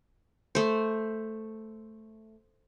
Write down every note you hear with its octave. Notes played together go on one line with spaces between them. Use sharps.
A3 C5